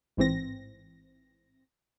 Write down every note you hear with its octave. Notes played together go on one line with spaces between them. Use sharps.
A1 G#2 E3 C4 A#6